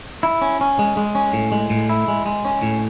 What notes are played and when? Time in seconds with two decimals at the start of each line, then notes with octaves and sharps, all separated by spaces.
0.23 E4
0.42 C#4
0.61 C#4
0.79 G#3
0.97 G#3
1.15 C#4
1.33 A2
1.52 G#3
1.70 A2
1.89 E4
2.08 G#3
2.26 G#3
2.45 C#4
2.62 A2